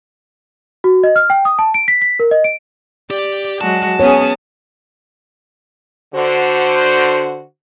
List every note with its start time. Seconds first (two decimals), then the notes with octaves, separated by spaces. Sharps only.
0.84 F#4
1.04 D#5
1.16 F6
1.30 G5
1.45 D#6
1.59 A5
1.74 D7
1.88 B6
2.02 B6
2.19 A#4
2.31 D#5
2.44 D7
3.10 G4 D5
3.61 F#3 G#3 F#4 A5
4.00 B3 C#4 G#4 C#5
6.14 D3 F#4 C5